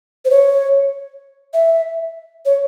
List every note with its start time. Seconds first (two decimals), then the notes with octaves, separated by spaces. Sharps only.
0.25 C5
0.30 C#5
1.54 E5
2.46 C#5